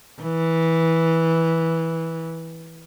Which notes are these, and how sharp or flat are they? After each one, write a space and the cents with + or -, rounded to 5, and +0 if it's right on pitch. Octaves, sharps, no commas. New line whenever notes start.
E3 -10